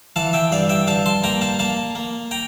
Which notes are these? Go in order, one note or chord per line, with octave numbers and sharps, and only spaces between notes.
E3 F5 A5
E5 G5
G2 D5 F5
E5 G5
G2 F5 A5
A5 C6
A#3 G5 A#5
F5 A5
A#3 F5 A5
A#3
G5 A#5